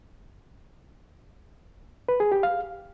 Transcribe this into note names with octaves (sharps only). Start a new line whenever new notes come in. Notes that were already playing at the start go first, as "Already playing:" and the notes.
B4
G#4
G4
F5